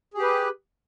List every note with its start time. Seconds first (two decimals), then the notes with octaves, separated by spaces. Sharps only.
0.14 G#4
0.18 G4
0.22 B4